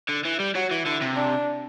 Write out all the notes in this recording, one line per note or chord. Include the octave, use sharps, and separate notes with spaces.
D3
E3
G3
F#3 F#4
E3
D3 E4
C3
D4